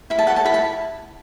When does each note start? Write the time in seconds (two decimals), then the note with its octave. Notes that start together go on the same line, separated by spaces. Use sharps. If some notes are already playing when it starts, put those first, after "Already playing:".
0.10 E4 B5
0.19 A5
0.27 A4 C#5 F#5
0.36 A5
0.45 E4 B5
0.54 A5